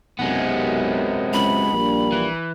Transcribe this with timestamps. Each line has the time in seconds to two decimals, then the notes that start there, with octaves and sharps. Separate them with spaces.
0.19 B1 F#2 C3 G#3 B3
1.33 C#2 B5
1.72 A#1 G3 A#3 D4
2.13 E3